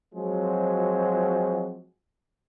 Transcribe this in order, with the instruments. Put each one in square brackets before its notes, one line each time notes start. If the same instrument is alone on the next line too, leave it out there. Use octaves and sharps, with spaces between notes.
[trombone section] F3 F#3 G#3 C4 F#4